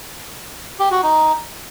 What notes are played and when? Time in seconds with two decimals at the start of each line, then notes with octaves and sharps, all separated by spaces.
0.79 G4
0.91 F#4
1.03 D#4